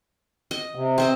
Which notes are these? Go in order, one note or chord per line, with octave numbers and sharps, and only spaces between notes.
D#5
C3
C4 C5 D#5